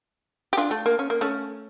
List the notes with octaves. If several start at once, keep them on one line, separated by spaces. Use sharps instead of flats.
G4
D4 F4
A3
A#3
C#4
A#3
A3 C#4